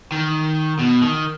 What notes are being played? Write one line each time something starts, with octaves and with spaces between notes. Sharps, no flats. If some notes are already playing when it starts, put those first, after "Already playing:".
D#3
B2
D#3